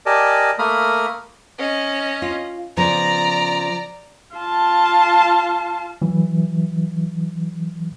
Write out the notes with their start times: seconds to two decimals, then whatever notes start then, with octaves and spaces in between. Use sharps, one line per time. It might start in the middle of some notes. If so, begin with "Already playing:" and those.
0.06 G4 A#4 D5 D#5 G#5 A5
0.59 A3 A#3 A#4 B5 D#6 F6
1.59 C#4 D#5
2.22 F4
2.77 C#3 F3 B3 D5 A#5
4.36 F4 A5
6.02 E3 F#3